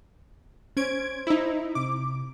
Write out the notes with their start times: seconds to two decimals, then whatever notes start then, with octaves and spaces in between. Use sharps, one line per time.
0.77 C#4 C5 G#6 D7
1.27 D#4 E4
1.75 C3 D6